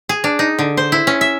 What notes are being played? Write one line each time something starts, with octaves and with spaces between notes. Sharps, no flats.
G#4
D4
D#4
D3
C5
E4
C#4
E5